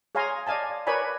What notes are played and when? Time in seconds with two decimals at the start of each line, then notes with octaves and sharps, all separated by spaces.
0.15 G#4 C#5 F5 G#5 A#5 C6
0.47 D5 D#5 F5 G#5 A5
0.87 A#4 B4 C#5 D5 G#5 B5